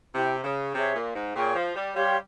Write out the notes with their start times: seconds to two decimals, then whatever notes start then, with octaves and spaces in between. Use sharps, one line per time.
0.14 C3 E4 G4 C5 G5
0.44 C#3
0.74 C3 G#4 C#5 E5
0.95 A#2
1.15 G#2
1.35 A#2 G#4 C#5 G5 C#6
1.55 F3
1.75 G3
1.96 G3 G4 C#5 F5 C6